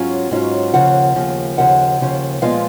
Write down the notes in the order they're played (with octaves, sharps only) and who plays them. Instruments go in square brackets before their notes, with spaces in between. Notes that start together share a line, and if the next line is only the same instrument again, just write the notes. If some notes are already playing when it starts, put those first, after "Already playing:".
Already playing: [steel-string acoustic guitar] G#2 F#3 C#4 F4
G#2 F#3 C#4 F4
D#2 C#3 F3 F#5
D#2 C#3 F3
D#2 C#3 F3 F#5
D#2 C#3 F3
A#2 F3 G#3 B3 F4 F5